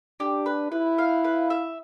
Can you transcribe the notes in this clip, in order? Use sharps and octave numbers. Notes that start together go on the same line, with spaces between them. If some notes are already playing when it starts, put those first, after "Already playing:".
D4 G4
B4
E4 B4
F5
B4
E5